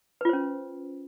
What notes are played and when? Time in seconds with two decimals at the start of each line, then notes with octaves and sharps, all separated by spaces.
0.21 B4
0.25 F4
0.29 C5
0.33 C#4